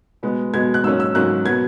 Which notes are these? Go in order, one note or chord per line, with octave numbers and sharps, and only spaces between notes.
B2 G#3 B3
B2 G#3 B3 G#6
F#6
G#2 F#3 A#3 C#4 E6
E6
G#2 F#3 A#3 C#4 F#6
B2 F#3 B3 G#6